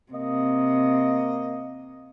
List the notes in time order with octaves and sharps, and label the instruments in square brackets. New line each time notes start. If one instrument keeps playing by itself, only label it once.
[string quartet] C3 [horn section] A#3 D#5